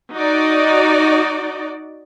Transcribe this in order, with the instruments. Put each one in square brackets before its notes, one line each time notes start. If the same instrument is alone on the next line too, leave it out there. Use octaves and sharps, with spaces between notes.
[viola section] D#4 F#4 D5 D#5